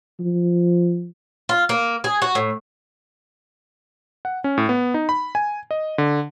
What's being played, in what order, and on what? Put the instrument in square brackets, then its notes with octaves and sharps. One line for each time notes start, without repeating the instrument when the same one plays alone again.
[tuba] F3
[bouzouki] F4
A#3
G#4
F#4
A2
[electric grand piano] F#5
C#4
A2
B3
D#4
B5
G#5
D#5
D3